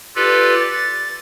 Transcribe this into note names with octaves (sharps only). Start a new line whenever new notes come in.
F4 G4 A4 B4 D5
A6